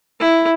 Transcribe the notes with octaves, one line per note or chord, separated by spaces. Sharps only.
E4